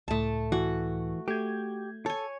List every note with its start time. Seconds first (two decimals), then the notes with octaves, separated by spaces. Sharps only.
0.08 C#2 A2 A3 A5
0.52 E3 F#4
1.28 A3 G4 G6 G#6
2.06 A4 C#5 G#5